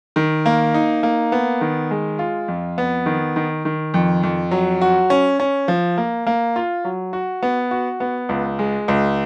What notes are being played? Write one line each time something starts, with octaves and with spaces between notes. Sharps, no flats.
D#3
A#3
D#4
A#3
B3
D#3
G#3
F4
F2
B3
D#3
D#3
D#3
F2
F2
F#3
F#4
C#4
C#4
F3
A#3
A#3
F4
F#3
F#4
B3
F#4
B3
C#2
G#3
C#2